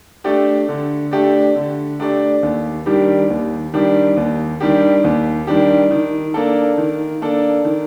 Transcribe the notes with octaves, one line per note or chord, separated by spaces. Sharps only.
A3 D4 G4 D5
D3
A3 D4 G4 D5
D3
A3 D4 G4 D5
D#2
D#3 G3 D4 G4
D#2
D#3 G3 D4 G4
D#2
D#3 G3 D4 G4
D#2
D#3 G3 D4 G4
D#3
A#3 D4 A4
D#3
A#3 D4 A4
D#3